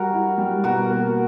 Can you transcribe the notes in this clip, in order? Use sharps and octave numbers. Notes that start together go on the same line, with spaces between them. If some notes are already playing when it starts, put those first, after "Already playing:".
Already playing: G3 F#4 A#4
E4
G3
B2 F#4 A#4
A#3